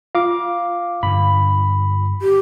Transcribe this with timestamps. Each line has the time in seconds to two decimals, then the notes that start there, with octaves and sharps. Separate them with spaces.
0.15 F4 F5 D6
1.03 G2 D3 B5
2.22 G4